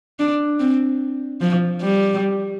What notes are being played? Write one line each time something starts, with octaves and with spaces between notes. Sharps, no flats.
D4
C4
F3
G3